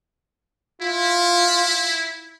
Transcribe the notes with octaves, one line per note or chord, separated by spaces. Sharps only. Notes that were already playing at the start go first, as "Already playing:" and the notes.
E4 F4